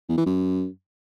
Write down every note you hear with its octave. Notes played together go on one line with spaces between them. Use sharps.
E2
E3
F#2